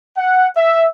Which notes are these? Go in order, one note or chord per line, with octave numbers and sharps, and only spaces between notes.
F#5
E5